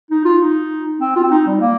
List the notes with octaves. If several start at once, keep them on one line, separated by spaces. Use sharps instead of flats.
D#4
F4
D#4
C4
F4
C4
D#4
G3
A#3